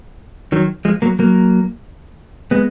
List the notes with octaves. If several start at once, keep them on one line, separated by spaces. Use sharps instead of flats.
D#3 F#3
F3 G#3
F#3 A#3
F#3 A#3
G#3 B3